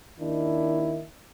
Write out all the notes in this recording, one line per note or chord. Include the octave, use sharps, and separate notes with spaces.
D#2 D#3 D4 E4